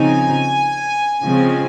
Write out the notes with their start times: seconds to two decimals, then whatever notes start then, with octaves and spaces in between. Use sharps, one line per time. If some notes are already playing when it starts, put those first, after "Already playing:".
Already playing: C#3 F3 C4 D#4 G#5
1.24 C#3 F3 G#3 C4